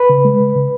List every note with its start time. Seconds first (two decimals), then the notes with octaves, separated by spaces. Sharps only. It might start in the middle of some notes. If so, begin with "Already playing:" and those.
Already playing: B4
0.09 C#3
0.25 G#3
0.40 C#3
0.55 C#3